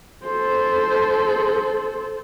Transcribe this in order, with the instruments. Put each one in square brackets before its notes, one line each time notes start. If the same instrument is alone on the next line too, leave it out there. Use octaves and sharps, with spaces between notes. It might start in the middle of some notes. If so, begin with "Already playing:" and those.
[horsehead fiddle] A4 C5